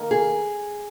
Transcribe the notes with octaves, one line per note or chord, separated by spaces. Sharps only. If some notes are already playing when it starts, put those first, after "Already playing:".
Already playing: D#3 A#3 D#4 A#4
G#4